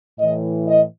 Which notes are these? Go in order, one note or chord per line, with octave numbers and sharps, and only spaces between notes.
A2 E3 D#5
D#5